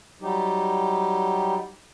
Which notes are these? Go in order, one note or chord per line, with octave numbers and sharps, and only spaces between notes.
F#3 G3 D#4 G4